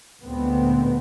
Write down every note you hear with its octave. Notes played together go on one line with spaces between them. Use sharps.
D2 A#2 D3 G#3 B3 C4